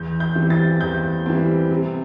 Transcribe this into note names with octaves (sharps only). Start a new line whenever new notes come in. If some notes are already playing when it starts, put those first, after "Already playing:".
Already playing: E2 G6
G6
E3 G3 C4
A6
E2 G6
E3 G3 C4
C3